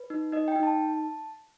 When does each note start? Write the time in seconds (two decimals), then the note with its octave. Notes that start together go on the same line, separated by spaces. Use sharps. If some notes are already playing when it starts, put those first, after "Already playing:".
Already playing: B4
0.10 D#4
0.32 D#4 D#5
0.48 G5
0.56 D#4
0.63 A5